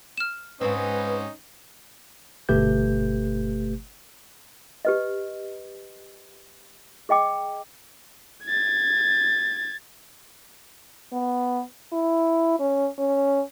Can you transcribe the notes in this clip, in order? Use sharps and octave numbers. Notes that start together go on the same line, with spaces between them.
F6 E7
G#2 C4 C#4 D#4 B4
G1 B2 A3 G4 B4 G6
G4 B4 D#5
G#4 D#5 G5 D6
G#6 A6
B3
E4
C#4
C#4